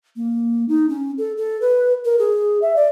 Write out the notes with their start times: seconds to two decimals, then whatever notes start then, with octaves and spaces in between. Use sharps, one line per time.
0.16 A#3
0.69 D#4
0.89 C#4
1.18 A4
1.37 A4
1.61 B4
2.05 A#4
2.19 G#4
2.62 E5
2.76 D5